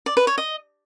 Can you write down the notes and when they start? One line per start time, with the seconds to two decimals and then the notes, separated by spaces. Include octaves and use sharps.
0.06 D5
0.17 B4
0.27 C#5
0.38 D#5